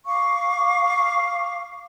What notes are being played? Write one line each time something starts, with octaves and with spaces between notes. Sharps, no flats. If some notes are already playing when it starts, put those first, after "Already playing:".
F5 C#6 D6